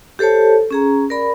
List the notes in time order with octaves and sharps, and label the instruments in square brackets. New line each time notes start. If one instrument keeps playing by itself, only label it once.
[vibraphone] G4 A4 C5 C#5 A5
C#4 G#4 A#5
A#4 D5 B5